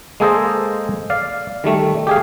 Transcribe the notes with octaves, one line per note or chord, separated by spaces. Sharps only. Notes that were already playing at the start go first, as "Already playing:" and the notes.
G#3 A#3 G#4 A4 C5 D#5
D5 F5
D#3 G3 A3
G4 G#4 F5